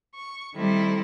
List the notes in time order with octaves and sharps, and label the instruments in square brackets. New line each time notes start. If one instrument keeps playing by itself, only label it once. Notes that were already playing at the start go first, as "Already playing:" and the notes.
[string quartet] C#6
D#3 G3 A3 C4 E4